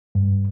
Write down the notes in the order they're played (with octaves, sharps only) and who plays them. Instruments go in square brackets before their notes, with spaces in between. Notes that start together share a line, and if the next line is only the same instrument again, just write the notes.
[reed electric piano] G2